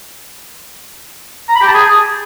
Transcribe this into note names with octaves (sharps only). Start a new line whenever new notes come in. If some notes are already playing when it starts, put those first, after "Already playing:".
A#5
B5
G4
A5
G#4